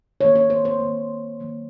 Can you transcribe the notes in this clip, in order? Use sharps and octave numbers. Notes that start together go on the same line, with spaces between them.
D#3 A#3 C#5
C#5
C5
C5
A#3
D#3
D#3 F#3 A#3